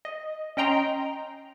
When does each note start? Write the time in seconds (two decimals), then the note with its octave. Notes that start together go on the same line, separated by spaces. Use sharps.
0.05 D#5
0.57 C#4 D#5 G5 A#5 C6